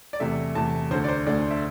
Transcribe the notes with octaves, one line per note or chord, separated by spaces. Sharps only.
D5
E2 C3 A3 E5
E2 C3 A3 A5
D2 D3 A3 C5
D5
C5
D2 D3 A3 D5
E5